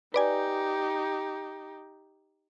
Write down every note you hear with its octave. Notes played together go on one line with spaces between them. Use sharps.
D#4 G4 B4 D5 G#5